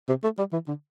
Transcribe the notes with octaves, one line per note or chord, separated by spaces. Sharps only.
C3
A3
G3
E3
D3